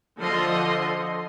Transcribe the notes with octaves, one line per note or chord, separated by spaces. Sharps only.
D3 F3 D#5 C6